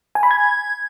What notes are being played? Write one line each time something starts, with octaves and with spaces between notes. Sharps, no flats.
G#5
B5
G#6